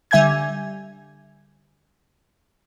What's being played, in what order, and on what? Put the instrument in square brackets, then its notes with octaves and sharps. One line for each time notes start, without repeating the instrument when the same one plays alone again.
[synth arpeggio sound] D3 G3 E5 G#5 G6 G#6